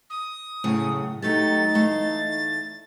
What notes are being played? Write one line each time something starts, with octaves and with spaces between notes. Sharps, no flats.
D#6
F#2 A2 C#3
F#3 A3 D#4 G4 A6
E2 A3 F5